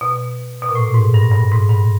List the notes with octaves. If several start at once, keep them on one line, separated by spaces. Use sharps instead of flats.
B2
B2
A#2
A2
G#2
G2
G2
G#2
G2